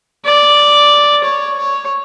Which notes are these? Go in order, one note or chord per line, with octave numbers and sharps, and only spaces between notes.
D5
C#5
C#5